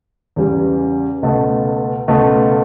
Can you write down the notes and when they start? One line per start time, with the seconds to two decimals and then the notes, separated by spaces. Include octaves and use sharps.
0.36 E2 C#3 G3
1.22 C#2 B2 A3
2.08 C#2 B2 A3